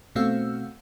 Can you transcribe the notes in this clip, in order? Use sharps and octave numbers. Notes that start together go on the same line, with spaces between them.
B2 A3 C4 F#4 F5 E6